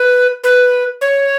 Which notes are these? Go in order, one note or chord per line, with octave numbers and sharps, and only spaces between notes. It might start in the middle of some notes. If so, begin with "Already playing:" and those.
Already playing: B4
B4
C#5